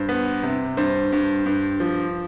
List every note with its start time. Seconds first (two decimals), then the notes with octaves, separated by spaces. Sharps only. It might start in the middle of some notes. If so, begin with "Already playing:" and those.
Already playing: G2 C5
0.09 B3
0.43 C3
0.77 G2 C5
1.12 G2
1.46 G2
1.80 F3